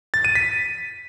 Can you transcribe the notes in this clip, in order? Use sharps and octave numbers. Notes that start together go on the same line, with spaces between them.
A6
D#7
B6